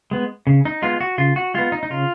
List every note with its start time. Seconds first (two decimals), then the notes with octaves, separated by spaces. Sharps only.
0.11 G#3 B3
0.47 C#3
0.65 D#4
0.82 G#3 B3 F4
1.01 F#4
1.18 C#3 F4
1.36 F#4
1.54 G#3 B3 F4
1.72 D#4
1.83 D#4
1.90 C#3 F4